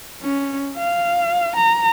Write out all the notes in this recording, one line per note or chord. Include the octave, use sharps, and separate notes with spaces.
C#4
F5
A#5